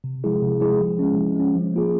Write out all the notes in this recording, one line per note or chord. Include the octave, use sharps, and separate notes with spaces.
C3
F3 G#3 E4 G#4
C3
F3 G#3 E4 G#4
F3
G#3 C#4
F3
G#3 C#4
F3
A#3 F4 G#4